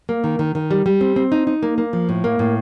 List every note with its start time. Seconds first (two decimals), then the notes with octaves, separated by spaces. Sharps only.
0.09 A#3
0.24 D#3
0.39 D#3
0.55 D#3
0.71 G3
0.86 G3
1.01 C4
1.16 C4
1.32 D#4
1.47 D#4
1.63 A#3
1.78 A#3
1.93 F3
2.09 A2
2.24 A#3
2.39 A2